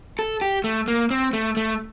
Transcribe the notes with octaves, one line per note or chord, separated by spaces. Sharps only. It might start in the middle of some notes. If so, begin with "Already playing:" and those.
A4
G4
A3
A#3
C4
A3
A3